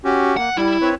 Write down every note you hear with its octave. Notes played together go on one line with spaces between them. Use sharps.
C#4 F#4 G4
A#3 F#5
G3 E4
C4 B4 C#5